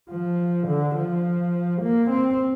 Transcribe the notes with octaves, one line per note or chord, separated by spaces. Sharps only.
F3
D3
F3
A#3
C4